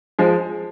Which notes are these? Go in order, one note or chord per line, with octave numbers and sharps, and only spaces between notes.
F3 G#3